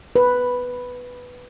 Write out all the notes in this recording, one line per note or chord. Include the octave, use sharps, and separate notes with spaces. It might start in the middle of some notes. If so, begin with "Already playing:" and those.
B4